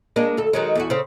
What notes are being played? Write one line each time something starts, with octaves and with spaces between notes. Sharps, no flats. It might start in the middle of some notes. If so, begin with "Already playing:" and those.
G#3 A#3 D4
D2 A4
D#3 F#3 G#3
E2 A3 F#4
C#3 C4